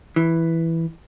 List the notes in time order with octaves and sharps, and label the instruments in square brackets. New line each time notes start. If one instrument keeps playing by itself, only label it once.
[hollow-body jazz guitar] E3